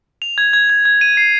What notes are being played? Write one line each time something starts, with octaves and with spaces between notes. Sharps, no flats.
F7
G#6
G#6
G#6
G#6
D#7
C7